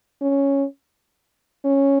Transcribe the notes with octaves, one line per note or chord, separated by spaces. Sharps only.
C#4
C#4